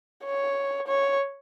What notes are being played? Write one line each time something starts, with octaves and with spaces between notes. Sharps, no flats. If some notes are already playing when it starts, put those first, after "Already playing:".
C#5
C#5